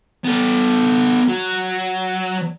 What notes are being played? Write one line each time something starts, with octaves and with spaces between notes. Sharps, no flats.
B3 A4
F#3